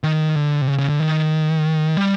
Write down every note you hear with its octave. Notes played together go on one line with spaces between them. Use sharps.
D#3
D3
C3
C#3
C#3
D3
D#3
G3